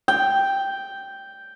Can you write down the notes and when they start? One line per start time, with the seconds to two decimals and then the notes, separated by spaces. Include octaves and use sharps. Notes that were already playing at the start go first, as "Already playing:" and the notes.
0.08 G5